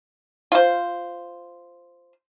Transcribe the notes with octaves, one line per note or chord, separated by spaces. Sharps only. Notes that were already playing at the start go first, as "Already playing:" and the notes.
F4 C5